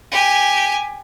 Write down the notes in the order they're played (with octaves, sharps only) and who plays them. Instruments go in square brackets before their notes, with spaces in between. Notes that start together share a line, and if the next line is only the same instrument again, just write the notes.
[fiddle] G4 G#5